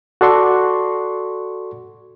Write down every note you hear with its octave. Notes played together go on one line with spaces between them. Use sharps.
F#4 A4 D5 C6 C#6